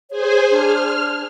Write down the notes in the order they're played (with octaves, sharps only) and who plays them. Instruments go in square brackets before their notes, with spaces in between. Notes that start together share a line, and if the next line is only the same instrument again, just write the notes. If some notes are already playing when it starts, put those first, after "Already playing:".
[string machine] G#4 C5 G#5 [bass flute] C#5
[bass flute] D4 [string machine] F6